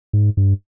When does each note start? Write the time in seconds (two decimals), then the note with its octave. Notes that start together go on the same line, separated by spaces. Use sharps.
0.13 G#2
0.37 G2